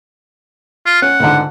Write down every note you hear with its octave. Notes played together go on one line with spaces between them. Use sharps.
F4
C#4 F#5
C#2 G#2 D3